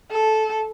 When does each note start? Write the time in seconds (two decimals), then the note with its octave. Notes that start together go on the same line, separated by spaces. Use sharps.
0.11 A4